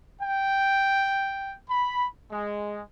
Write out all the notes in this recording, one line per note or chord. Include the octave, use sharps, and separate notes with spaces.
G5
B5
G#3